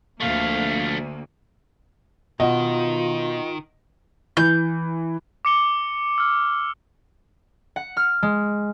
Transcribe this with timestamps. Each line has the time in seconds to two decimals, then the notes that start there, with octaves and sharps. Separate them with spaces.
0.20 D2 F3 A3 A#3 F5
2.40 B2 D#3 F4 D#5 F#5
4.37 E3 G6
5.45 D6 C#7 G7
6.18 E6 F6
7.76 F#5
7.97 F6
8.23 G#3